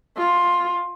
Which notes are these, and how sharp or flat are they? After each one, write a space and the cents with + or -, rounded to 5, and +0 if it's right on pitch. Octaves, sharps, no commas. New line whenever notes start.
F4 +10